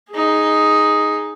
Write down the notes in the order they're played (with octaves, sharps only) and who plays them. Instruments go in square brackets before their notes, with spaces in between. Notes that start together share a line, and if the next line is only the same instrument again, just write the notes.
[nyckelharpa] D#4 G#4